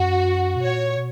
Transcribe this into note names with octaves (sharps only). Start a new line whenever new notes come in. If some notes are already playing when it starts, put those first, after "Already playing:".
Already playing: F#2 F#4
B2
A#2 C#5
B2